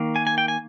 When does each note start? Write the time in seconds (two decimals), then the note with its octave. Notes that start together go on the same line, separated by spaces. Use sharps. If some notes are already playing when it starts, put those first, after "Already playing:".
Already playing: D#3 A#3
0.16 G#5
0.27 G#5
0.38 G5
0.48 G#5